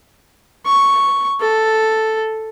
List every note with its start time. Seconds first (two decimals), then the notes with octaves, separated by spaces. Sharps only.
0.66 C#6
1.41 A4